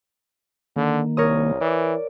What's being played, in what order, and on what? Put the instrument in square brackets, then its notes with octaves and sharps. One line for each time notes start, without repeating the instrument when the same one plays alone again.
[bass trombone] D3 [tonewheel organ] D#3 A#3
[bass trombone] C2 [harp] A#4 C#5 D#6
[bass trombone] E3 [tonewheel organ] D5